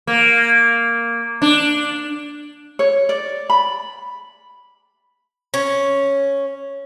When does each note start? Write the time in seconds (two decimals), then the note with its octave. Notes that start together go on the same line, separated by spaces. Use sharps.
0.07 A#3
1.42 D4
2.79 C#5
3.09 D5
3.50 B5
5.54 C#4